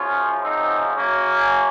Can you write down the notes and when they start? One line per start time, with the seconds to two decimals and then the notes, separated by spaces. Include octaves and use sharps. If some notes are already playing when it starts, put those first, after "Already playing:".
Already playing: F#2 C#3 F3 C#4 F4
0.42 C4 D#4
0.94 F#2 C#3 F#3 A#3 C#4